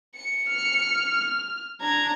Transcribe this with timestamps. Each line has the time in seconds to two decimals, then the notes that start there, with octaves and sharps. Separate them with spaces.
0.16 C#7
0.50 F6
1.81 D4 A#5 G#6